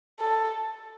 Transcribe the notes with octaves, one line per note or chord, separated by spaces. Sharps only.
A4